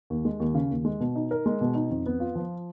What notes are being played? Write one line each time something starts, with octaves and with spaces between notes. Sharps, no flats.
D#2
G#3
D#2
C#3
D#2
G#3
B2
D#4
A#4
G#3
B2
D#4
F2
B3
F4
F3